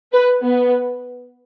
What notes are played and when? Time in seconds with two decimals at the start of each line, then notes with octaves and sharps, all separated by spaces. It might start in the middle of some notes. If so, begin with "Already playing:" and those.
0.12 B4
0.42 B3